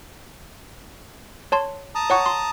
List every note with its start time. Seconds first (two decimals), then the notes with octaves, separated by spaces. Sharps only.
1.52 C#5 A5 C6
1.95 A5 A#5 D#6
2.10 C#5 F#5 C#6
2.26 C6